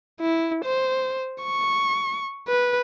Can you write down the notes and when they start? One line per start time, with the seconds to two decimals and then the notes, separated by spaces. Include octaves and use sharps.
0.20 E4
0.65 C5
1.44 C#6
2.48 B4